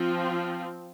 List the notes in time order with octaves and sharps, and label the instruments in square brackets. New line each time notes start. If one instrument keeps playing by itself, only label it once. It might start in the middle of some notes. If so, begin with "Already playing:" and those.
Already playing: [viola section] F3 C4 F4